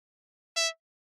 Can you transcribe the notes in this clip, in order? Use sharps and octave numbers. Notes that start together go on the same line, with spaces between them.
E5